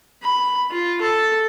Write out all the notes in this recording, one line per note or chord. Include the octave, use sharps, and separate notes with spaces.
B5
F4
A4